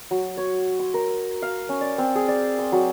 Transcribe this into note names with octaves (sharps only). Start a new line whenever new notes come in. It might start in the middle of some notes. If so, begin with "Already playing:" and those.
F#3
C#5
C6
A#4
F5
C#4
D5
C4
G#4
D5
C6
F#3